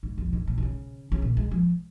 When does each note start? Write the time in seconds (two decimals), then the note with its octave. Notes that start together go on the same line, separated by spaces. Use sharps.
0.03 G#2
0.18 F2
0.26 A#2
0.33 G#2
0.47 A#2
0.58 A#2
0.62 C#3
1.12 C#3
1.22 A#2
1.37 G#3
1.51 F3